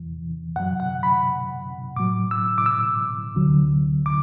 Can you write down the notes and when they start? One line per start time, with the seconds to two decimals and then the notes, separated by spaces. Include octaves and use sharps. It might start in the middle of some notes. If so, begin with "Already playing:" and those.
Already playing: E2 E3
0.56 F#2 F#3 F#5
0.80 F#5
1.03 B5
1.96 A2 F#3 D6
2.31 E6
2.58 D6
2.66 E6
3.35 D2 D3 F#3
4.06 D6